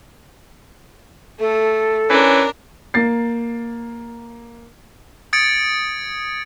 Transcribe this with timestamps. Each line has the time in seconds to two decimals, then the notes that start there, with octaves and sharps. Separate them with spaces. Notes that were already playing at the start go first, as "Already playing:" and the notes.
1.40 A3 A4
2.10 E3 C#4 D4 A#4
2.94 A#3 A6 C7
5.33 D#6 G#6 A6 C#7 D7